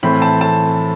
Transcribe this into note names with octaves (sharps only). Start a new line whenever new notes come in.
A2 E3 A3 C4 B5
A5
A5